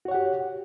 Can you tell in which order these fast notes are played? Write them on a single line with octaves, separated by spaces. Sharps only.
F#4 C#5 F#5 G4